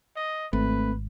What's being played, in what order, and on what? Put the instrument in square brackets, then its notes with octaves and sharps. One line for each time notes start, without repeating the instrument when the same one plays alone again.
[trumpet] D#5
[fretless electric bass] G#1 [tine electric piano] A3 C4 [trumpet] B4